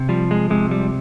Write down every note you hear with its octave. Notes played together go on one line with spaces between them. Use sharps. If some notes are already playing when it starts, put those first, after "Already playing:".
Already playing: C3
F3 G3
G#3
C3 G#3
G3